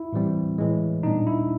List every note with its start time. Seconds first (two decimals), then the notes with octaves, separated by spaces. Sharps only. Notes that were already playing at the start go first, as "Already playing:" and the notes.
Already playing: E4
0.12 A2 E3 G3 C4
0.58 A2 E3 G#3
1.03 A#2 G3 B3 D4 D#4
1.27 E4